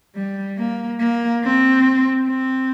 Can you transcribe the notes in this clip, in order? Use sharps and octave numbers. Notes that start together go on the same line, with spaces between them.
G3
A#3
A#3
C4
C4